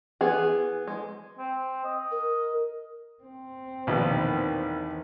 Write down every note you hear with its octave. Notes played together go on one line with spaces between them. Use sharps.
E3 B3 G#4
G#3
C4
D#5
A#4
C4
A#1 E2 B2 D#3